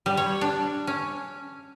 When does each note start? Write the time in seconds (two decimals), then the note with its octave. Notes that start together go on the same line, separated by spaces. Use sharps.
0.06 G3
0.17 C#5
0.41 D4
0.87 C#4